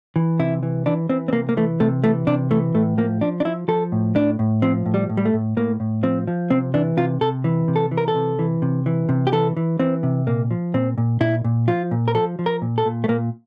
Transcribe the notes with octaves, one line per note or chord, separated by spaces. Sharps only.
E3
C3 E4
E3
E3 D4
E3 C4
C4
C3 A#3
A#3
E3 A3
C3 A3
E3 A3
C3 D4
E3 A3
A2 A3
F3 A#3
F3 D4
D4
F3 E4
F3 A4
A2
A2 D4
A2
F3 C4
A2
G3
A2
G3
A3
A2
A2 A#3
A2
F3 C4
F3
C3 C4
E3 D4
C3 F4
C3 A4
E3
C3
A4
E3
A#4
A4
C3
E3
C3
E3
C3
G4
E3 A4
E3
E3 C4
C3
A#2 A#3
F3
A#2 C4
A#2
A#2 E4
A#2
F3 F4
A#2
A#4
F3 A4
F3
A#4
A#2
A4
A#2
A3
A#2 A#3